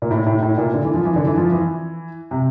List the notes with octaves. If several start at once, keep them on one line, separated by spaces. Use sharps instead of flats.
A#2
A2
A2
A2
A#2
D3
E3
F3
E3
D3
E3
F3
E3
C3